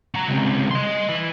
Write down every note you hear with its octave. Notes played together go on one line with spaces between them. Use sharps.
F#4 A#5
C#2 C3
D#5 C6
E3 B5